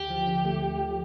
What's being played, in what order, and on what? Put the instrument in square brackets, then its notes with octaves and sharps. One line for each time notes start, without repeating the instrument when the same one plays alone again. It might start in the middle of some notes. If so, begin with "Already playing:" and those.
Already playing: [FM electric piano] D2 [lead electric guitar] G4
[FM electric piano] F3
D3
A3
D2
F3